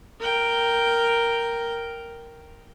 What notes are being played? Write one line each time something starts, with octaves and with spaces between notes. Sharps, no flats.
A#4 G5